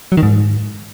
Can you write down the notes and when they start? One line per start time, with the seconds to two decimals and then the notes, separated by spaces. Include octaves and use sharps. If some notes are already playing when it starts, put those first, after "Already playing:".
0.12 F#3
0.17 D#3
0.23 G#2